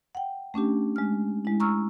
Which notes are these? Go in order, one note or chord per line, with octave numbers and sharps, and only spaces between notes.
F#5 G5
A3 C#4 D4 G4
G#3 F6
G#3 E4
A#5 C#6 E6 F6